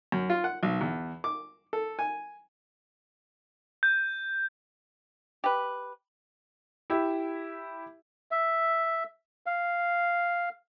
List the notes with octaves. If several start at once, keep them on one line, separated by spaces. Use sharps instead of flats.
F#2
F4
F#5
B1
E2
D6
A4
G#5
G6
G4 B4
E4 G4 E5
E5
F5